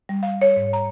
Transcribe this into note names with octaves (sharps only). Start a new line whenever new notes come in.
G3
F5
C#5
G#2
A#5